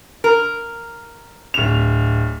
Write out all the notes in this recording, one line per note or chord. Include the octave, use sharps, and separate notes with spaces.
A#4
D1 F7